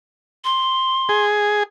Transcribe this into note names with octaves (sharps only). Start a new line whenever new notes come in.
C6
G#4